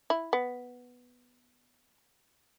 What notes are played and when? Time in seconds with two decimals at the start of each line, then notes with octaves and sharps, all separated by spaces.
0.10 E4
0.33 B3